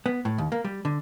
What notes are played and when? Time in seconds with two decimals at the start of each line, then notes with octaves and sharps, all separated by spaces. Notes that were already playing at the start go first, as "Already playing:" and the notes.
0.06 B3
0.25 A2
0.38 D#2
0.52 A#3
0.65 G3
0.85 D3